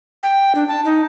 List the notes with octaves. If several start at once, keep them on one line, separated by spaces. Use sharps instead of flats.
G5
D4
A5
D#4